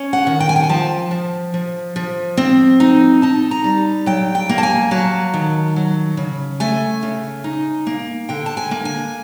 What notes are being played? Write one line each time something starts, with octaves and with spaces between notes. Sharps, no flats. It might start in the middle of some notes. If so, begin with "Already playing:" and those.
Already playing: C#4
F#5
D#3
G5
G#5
G5
G#5
F3 A5
F3
F3
F3
C4
D#4
D#4 A5
A#5
G3
F#3 G5
G5
A#3
A5
G#5
F#3 A5
D#3
F#3
C#3
A3 G#5
C#3
D#4
A#3
D3 G5
A5
G#5
A#3
G#5